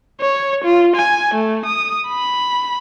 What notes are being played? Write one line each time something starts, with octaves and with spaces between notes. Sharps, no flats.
C#5
F4
G#5
A3
D#6
B5